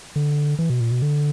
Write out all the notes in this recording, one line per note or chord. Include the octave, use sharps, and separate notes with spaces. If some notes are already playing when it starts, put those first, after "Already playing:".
D3
E3
B2
A#2
B2
D3